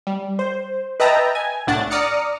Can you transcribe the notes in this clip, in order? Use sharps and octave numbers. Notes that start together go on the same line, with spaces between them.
G3
C5
B4 D#5 E5 G5 A5 A#5
G#5
C2 A2 D4 F#5 A6
D5 A#5 D#6 F6 C#7